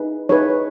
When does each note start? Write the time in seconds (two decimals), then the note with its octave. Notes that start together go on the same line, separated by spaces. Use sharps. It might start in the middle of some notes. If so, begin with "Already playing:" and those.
Already playing: D#4 G#4 B4
0.29 D#4 G#4 B4 C#5